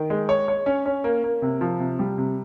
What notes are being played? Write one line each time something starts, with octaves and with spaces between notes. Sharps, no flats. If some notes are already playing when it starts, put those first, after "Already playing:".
Already playing: D#3
G#3
C#5
C#5
C#4
C#4
A#3
A#3
C3
F3
C3
G3
C3